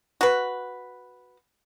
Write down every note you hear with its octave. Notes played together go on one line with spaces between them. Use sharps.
F#4 B4